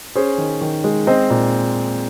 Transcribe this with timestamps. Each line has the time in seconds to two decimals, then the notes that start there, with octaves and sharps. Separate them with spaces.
0.15 C#4 G#4 C5
0.38 D#3
0.61 D#3
0.84 G#3
1.07 C4 C5 D#5
1.30 A#2